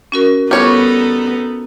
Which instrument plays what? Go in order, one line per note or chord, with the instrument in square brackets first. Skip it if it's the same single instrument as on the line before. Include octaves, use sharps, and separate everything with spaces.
[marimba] C#4 F#4 A#4
[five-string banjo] G3 C#5 [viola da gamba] B3 D#4 A4 [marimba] F4 C#6